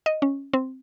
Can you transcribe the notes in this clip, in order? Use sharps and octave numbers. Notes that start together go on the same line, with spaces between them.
D#5
C#4
C4